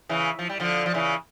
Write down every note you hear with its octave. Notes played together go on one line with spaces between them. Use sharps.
C#3 E3
F3
G3
D3 F3
F3
C#3 E3